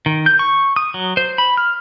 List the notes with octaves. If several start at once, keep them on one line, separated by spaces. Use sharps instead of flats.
D#3
G6
C#6
D#6
F#3
C5
B5
F6